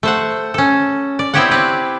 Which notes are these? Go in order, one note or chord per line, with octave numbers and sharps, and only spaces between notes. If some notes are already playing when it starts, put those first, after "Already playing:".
A3 C5 F#5
C#4 A4
D5
B3 C4 E4 G4 C#5 F#5
C4 B4 D5